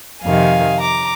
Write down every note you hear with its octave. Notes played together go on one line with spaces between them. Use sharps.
F2 C3 D#3 F5 G#5
A#5 D6